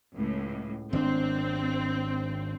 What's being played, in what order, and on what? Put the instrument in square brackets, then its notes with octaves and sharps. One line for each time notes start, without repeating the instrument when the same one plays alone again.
[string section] C#2 A2
[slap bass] G#1 D#3 D4 [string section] C4